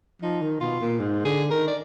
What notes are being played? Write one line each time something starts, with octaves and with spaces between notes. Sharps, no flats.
F3 D#4
D#3
B2 F4
A#2
G#2
D3 G#4
D#3 A#4
D5